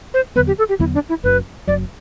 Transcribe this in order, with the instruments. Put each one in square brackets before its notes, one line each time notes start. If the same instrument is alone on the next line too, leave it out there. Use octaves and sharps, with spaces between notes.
[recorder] C5
[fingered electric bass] E2 D3 F#3 B3 [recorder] B4
[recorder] G4
A4
G4
[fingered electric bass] E2 D3 F#3 B3 [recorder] E4
[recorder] D4
E4
[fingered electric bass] F#1 F#2 F#3 [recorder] B4
[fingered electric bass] F#1 F#2 F#3 [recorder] D5